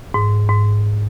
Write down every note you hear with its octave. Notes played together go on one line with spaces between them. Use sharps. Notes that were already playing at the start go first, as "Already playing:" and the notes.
G#2
G#2